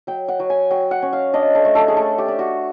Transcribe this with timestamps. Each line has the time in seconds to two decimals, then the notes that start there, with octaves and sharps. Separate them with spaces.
0.07 F#3 G5
0.28 F#5
0.40 F#3
0.50 G#5
0.71 F#3 G5
0.91 F#5
1.02 C#4
1.13 F5
1.33 D4 D#5
1.55 A4
1.65 A3
1.75 A4
1.88 G#4
1.96 A3 A4
2.18 G4
2.28 D4
2.39 F#4